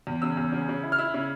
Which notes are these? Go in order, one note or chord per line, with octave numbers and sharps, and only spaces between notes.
E2
C#3 E6
E2
C#3
C#3
E4
F6
E4 E6
C#3